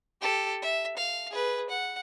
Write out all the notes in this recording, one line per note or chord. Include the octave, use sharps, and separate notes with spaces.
G4 A4
E5
F5
G#4 B4
F#5